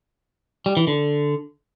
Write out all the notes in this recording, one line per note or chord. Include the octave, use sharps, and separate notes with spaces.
G3
E3
D3